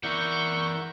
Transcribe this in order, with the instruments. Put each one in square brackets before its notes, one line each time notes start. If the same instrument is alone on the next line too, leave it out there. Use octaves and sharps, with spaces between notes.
[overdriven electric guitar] E3 D5 [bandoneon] A#4 E5 F#5 [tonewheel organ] C#6 G6